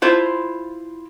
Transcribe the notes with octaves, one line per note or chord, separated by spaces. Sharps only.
E4 F4 C5